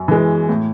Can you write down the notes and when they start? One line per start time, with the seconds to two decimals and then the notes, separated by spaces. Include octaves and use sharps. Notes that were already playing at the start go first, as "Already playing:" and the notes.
Already playing: F#2
0.08 E3 G#3
0.49 A2